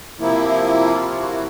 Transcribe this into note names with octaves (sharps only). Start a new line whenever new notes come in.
C3 F3 A#3 E4
F4
E4 F#4